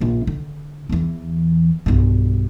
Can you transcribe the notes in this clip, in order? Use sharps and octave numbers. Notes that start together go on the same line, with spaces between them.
A#1 F4
D3
E2 E3
B1 G2